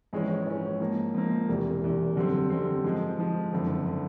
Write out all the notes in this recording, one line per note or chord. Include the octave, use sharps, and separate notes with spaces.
A#1 G#2 E3 G#3 C#4
A#1 G#2 E3 G#3 C#4
G#2 F3 A#3
G#2 F3 A#3
E1 E2 C3
E1 E2 C3
F#2 D3 G3 C4
F#2 D3 G3 C4
G#2 F3 G#3
G#2 F3 G#3
F#1 F2 D3
D3